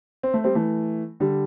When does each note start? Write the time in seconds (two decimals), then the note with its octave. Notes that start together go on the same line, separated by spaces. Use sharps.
0.23 C4
0.34 A3
0.44 G3 C4
0.55 E3 A3
1.20 D3 G3